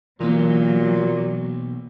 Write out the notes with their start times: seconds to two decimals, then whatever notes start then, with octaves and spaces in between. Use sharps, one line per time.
0.21 B1 A#2 E3 F#3 A#3